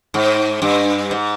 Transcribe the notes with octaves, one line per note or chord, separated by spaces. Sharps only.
G#2
G2
G#2